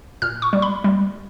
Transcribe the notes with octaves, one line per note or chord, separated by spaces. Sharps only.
A#2 F6
C#6
G3
B5
G3